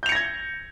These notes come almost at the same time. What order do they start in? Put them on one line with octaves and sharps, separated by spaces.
G6 F7 C#7 A#6 G#6